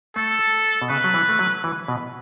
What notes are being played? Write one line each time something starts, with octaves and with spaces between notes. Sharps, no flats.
A3 A4
B2
C#3 B4
F#3
E3
A3
F#3
E3
B2